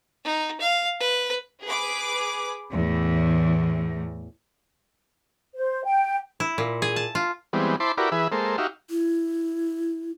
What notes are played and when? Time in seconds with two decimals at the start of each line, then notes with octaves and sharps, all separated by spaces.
0.24 D#4
0.61 F5
1.00 B4
1.64 G#4 B4 D6
2.72 E2 A2
5.56 C5
5.84 G5
6.40 E4
6.58 A#2
6.82 G#4
6.96 A5
7.15 F4
7.53 E3 G3 G#3 B3 C4
7.80 E4 C5 A5 B5 C6 D6
7.97 E4 F#4 G4 A#4 B4 D5
8.12 E3 G#4 B4 E5
8.32 G#3 A#3 A4 C5
8.58 D#4 F#4 G4 E5 F5
8.90 E4